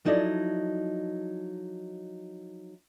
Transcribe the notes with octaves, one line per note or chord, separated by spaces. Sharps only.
F3 F#3 D#4 E4 A4 D5